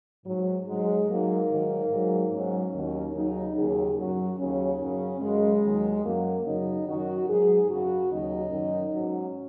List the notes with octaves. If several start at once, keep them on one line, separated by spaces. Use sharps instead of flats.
G#2 F#3
G#2 F#3 G#3
G#2 F#3 A#3
G#2 D#3 F#3
G#2 F#3
G#2 F#3 C#4
D#2 D#3 F#3
D#2 C#3 F#3 D#4
D#2 C#3 F#3 G#4
F#2 F#3 F#4
D#2 C#3 F#3 C#4
F#2 C#3 F#3
F#2 C#3 F#3 G#3
D#2 D#3 F#3
F#2 F#3 A#3
F#2 C#3 F#3 D#4
F#2 D#3 F#3 F#4
G#2 F#3 G#4
F#2 C#3 F#3 F#4
D#2 C#3 F#3 D#4
F#2 D#3 F#3
G#2 F#3 C#4